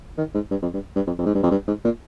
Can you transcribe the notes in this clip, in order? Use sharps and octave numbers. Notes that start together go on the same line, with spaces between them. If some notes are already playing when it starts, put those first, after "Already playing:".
D#3
G#2
G2
F2
G2
G2
F2
F2
G#2
G2
F2
G2
G#2
A#2